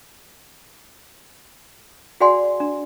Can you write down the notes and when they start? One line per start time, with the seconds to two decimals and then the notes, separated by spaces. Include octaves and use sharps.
2.20 F#4 G#4 D5 F#5 G#5 C6
2.60 D4